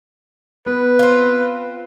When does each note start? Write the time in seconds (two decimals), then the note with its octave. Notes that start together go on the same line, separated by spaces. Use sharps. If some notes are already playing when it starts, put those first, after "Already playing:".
0.66 B3 B4
0.99 C4 F4